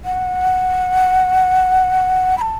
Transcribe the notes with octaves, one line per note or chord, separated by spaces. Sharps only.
F#5
B5
A5